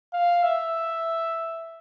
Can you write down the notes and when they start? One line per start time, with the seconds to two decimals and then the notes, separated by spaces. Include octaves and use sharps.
0.13 F5
0.43 E5